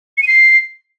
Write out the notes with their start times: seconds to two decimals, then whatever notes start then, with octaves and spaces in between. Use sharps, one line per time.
0.17 C#7
0.22 D#7
0.27 C7